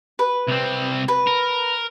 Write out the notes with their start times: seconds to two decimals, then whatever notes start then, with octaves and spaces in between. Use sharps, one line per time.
0.19 B4
0.48 C2 C4
1.08 B4
1.27 A#4